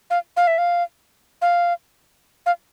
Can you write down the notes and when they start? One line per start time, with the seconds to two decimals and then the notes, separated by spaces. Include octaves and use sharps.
0.10 F5
0.37 F5
0.47 E5
0.58 F5
1.42 F5
2.46 F5